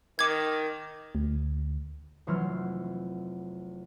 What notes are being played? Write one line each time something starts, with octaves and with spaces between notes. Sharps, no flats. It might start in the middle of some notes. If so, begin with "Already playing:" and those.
D#3 D6 G#6
D2
F1 E3 F#3 C6 F6